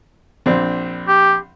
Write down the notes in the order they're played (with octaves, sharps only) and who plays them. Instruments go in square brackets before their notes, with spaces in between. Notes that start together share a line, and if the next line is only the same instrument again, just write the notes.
[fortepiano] A#1 C4 D4
[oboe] G4